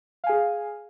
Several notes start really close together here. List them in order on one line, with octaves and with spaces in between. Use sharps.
F5 G#5 G#4